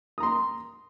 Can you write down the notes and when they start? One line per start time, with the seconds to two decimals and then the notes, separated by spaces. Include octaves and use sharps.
0.18 D#6
0.20 A#5
0.23 C6